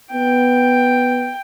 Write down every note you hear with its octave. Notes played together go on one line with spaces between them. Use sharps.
B3 G5